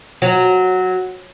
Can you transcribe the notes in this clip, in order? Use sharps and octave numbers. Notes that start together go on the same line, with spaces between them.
F#3